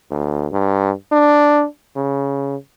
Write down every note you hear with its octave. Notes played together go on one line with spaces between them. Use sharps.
D2
G2
D4
C#3